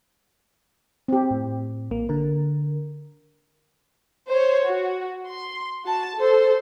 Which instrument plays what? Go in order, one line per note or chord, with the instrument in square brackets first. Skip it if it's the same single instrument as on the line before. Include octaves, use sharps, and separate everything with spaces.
[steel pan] C4 G4
[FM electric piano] A2
A#1 A#3
D3 A#4
[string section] C5 C#5
F#4
C6
F#4 A5
A4 C5